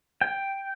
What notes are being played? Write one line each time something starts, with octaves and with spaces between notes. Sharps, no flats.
G5